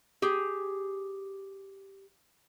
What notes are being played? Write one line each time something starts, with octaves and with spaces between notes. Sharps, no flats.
G4 G#4